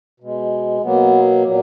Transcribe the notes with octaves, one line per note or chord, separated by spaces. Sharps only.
B2 G#3
B2 F#3 A#3 B3
A#2 F#3